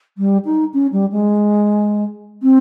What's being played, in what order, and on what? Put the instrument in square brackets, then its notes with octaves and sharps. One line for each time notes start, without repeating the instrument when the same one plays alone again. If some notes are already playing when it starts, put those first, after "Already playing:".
[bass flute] G3
D#4
C#4
G3
G#3
C4